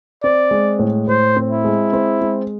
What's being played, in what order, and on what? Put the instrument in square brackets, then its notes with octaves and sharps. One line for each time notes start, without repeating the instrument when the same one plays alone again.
[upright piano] C4 [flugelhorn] D5
[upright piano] G#3
A2
[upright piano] A2 [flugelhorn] C5
[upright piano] C4
[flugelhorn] E4
[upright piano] G#3
C4
G#3